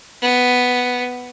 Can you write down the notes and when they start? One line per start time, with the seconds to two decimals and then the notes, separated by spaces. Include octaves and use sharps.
0.22 B3